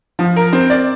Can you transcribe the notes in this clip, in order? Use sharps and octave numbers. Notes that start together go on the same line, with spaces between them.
F3
A#4
C4
D5